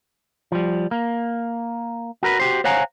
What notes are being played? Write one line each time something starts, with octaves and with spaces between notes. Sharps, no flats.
F3 G3
A#3
F#4 A#4 B4
F#4 G4 C5
C5 C#5 F5 F#5 G#5 A#5